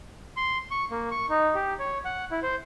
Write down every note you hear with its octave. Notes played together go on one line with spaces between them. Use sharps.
C6
C#6
A#3
C#6
D#4
G4
C#5
F#5
E4
C5